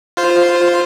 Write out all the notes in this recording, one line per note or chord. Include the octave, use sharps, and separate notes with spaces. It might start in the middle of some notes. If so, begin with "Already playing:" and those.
F4 C5